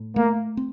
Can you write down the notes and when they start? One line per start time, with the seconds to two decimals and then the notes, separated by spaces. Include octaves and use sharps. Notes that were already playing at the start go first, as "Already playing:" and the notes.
Already playing: A2
0.16 A3 A#3
0.57 C4